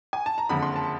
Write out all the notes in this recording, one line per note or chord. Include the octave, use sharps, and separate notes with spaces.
G#5
A5
A#5
F#1 F2 D3 B5
C6
A5